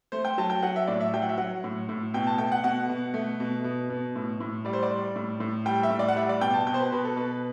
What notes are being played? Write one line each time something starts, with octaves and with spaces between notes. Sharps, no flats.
A3 C5
G5
F#3 A5
G5
F#3 F#5
E5
A2 D5
E5
F#3 G5
F#5
E5
F#3 F#5
A2
A2
B2 G5
A5
A3 G5
F#5
B2 F#5
B2
A3
B2
B2
B2
A2
A2
G3 D5
C5
D5
G3
A2
A2
G3 G5
E5
A2
D5
F#5
G3 E5
D5
B2 G5
A5
B2 G5
C5
B4
B2 B4
A4
B2 B4